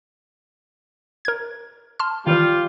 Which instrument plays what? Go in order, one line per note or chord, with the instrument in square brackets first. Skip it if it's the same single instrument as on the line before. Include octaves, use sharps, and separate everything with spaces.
[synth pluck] A#4 G#6
A5 C6 F6
[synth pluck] D#3 E3 [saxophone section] G3 F4